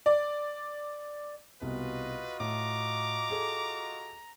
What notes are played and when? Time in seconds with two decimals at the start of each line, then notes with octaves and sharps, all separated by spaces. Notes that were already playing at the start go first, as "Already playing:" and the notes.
0.06 D5
1.61 C2 B2 F4 F#4 B4 D#5
2.40 A2 A#5 D6
3.30 G#4 A4